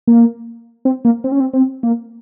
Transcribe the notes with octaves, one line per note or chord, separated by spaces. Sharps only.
A#3
C4
A#3
C4
C#4
C4
C4
A#3